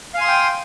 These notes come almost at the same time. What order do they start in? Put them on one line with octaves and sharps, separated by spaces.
F5 G#5 C6 D#6 G5